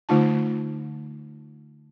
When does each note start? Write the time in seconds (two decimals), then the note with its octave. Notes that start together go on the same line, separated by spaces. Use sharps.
0.09 D3 A3 D#4 F4 A5